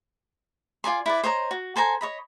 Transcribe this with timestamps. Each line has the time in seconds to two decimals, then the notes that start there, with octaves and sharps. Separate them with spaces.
0.84 F4 D5 G#5 C6
1.06 E4 B4 D5
1.24 C5 C#5 D#5 A#5
1.51 F#4
1.76 A4 C5 G#5 A#5
2.01 C#5 D#5 B5